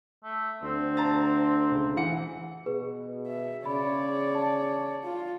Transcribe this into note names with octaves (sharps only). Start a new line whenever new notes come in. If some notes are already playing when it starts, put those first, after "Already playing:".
A3
D2 C4
A5 A#5 A6
C#2
E3 F#5 C#7
B2 G#4 B4
E5
C#3 C#5 D5 B5
A5
F4